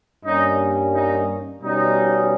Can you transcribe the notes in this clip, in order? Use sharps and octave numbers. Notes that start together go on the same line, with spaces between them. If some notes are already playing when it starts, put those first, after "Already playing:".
G2 G3 A#3 C#4 D#4
D#4
B2 G3 C#4 D#4